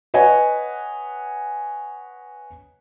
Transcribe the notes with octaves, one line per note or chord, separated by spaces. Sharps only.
B4 C#5 D#5 F#5 G#5